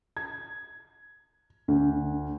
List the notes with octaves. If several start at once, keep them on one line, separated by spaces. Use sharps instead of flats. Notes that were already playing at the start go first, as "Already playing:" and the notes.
G#6
D2